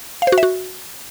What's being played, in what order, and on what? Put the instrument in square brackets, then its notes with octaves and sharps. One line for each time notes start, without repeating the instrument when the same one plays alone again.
[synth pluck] F5
C5
F#4
E5
F#4